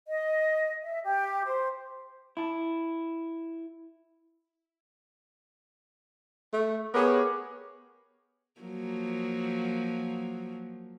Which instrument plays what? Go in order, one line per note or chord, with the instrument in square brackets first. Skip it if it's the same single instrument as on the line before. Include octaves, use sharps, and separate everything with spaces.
[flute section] D#5
E5
G4
C5
[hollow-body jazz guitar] E4 A5
[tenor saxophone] A3
[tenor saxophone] B3 [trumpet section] G4 C#5 D6 [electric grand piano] G#4 A#4
[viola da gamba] F3 F#3 A#3